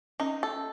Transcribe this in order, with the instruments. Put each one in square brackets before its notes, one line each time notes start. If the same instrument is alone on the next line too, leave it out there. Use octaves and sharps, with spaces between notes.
[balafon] C#4 [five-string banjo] D#4
[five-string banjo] A4